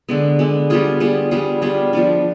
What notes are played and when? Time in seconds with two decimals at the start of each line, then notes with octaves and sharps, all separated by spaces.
0.09 D3 G#3 B3
0.39 D3 G#3 B3
0.70 G3 B3 F4 G#4
1.00 G3 B3 F4 G#4
1.31 G3 B3 F4 G#4
1.62 G3 B3 F4 G#4
1.93 F3 B3 D4